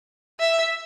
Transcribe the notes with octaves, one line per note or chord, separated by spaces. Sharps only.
E5